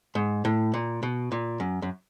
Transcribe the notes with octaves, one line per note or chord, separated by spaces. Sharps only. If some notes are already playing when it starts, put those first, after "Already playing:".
G#2
A2
A#2
B2
A#2
F#2
F#2